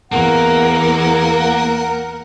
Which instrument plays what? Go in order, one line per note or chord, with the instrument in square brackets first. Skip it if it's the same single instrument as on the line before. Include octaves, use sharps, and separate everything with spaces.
[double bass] E2 [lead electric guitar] A#3 [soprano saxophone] A#4 [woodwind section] F#5